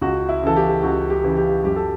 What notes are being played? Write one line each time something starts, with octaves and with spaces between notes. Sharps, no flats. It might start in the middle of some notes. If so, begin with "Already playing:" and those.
C#2 F#4
E4
C#3 E3 A4
G4
C#2 F#4
G4
C#3 E3
G4
F#2 G4
A4